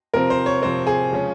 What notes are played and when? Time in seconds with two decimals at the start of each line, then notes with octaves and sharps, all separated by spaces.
0.14 C3 F3 C4 A#4
0.30 C5
0.46 C#5
0.62 C3 F3 C4 C5
0.87 G#4
1.12 C#3 F3 G#3 C#4